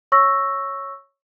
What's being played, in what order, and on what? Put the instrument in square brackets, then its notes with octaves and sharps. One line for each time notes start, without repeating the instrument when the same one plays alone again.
[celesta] C#5 C#6 E6 A#6